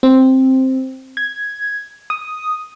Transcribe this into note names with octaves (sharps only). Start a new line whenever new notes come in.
C4
G#6
D#6